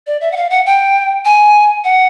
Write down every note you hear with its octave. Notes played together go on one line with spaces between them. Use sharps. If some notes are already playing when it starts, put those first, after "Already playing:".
D5
E5
F#5
F5
F#5
G5
G#5
F#5